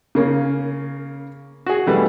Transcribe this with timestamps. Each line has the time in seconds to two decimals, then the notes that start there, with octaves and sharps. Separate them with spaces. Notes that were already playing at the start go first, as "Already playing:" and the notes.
0.15 C#3 A#3 C#4
1.66 F#4 G#4
1.87 B2 E3 G3 A3 B3